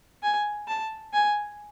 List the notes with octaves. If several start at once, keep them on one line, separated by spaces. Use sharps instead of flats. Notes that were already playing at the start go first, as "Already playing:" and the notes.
G#5
A5
G#5